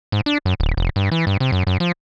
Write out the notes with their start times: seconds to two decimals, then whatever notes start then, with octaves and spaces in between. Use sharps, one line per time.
0.12 G#2
0.26 D4
0.45 F#2
0.60 D1
0.77 F1
0.96 G2
1.11 E3
1.27 G2
1.40 C3
1.52 F#2
1.67 F#2
1.80 F3